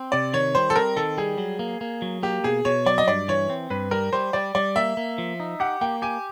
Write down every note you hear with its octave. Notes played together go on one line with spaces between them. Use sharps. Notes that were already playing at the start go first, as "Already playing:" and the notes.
Already playing: C4
C3 D5
D#3 C#5
G3 C5
A4
C4 A#4
D#3 A4
G3 G#4
F#3
A#3
A#3
F#3
A#3 G4
B2 G#4
B2 C#5
F#3 D5
D#5
G2 D5
E3 C#5
C4
G2 B4
G3 A#4
G3 C5
G3 D5
G3 D5
A#3 E5
A#3
F3
D#4
G4 F#5
A#3 G5
G4 G#5